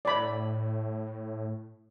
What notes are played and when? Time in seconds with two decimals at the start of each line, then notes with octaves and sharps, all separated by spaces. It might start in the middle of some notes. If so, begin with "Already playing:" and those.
0.05 A2 D5 B5